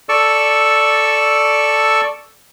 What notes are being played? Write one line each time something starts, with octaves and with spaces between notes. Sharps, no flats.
A4 D5 C#6 E6